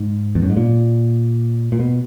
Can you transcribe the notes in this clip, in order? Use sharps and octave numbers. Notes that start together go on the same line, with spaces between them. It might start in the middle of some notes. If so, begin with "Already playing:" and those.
Already playing: G#2
E2
F#2
G#2
A#2
A#2
B2